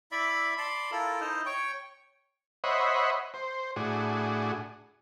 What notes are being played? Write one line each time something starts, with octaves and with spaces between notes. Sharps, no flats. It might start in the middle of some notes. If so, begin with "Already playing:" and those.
E4 D5 E5 B5
D5 A5 B5 C6
E4 F4 A4 A#4
D#4 E4 C5 D#5
C#5 G5 C#6
C5 C#5 D#5 E5 F#5 B5
C5
A2 D4 F#4 G#4